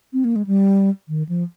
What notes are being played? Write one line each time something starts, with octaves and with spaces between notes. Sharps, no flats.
C4
A#3
G#3
G3
D#3
F3